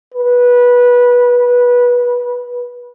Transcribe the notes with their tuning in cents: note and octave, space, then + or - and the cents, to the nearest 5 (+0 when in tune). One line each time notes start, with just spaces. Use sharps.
B4 -20